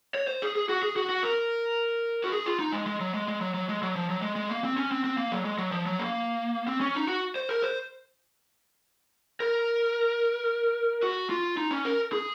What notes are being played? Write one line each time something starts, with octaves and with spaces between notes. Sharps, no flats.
C#5
C5
G#4
G#4
F#4
G#4
F#4
F#4
A#4
F#4
G#4
F4
D#4
G#3
G#3
F#3
G#3
G#3
F#3
F#3
G#3
F#3
F3
F#3
G#3
G#3
A#3
C4
C#4
C4
C4
A#3
F#3
G#3
F#3
F3
F#3
A#3
C4
C#4
D#4
F#4
C5
A#4
C5
A#4
F#4
F4
D#4
C#4
A#4
G#4